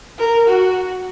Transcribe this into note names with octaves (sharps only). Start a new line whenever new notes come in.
A#4
F#4